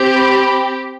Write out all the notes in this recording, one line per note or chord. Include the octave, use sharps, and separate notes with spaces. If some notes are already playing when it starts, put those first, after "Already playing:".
Already playing: C4 G4
B5